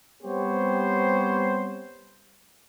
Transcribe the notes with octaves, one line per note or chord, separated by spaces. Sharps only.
G3 B3 C4 G4 C5 C#5